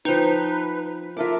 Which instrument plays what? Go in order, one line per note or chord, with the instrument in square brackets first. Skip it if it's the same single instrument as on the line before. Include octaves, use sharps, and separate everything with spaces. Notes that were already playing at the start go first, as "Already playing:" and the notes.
[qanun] F3 G5 [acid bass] D#4 [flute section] B4
[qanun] F4 A4 D6 [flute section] A#4 E5